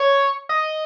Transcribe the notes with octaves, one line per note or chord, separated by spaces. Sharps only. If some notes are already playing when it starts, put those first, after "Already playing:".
Already playing: C#5
D#5